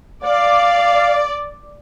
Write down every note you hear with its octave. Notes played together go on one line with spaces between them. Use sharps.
D5 F5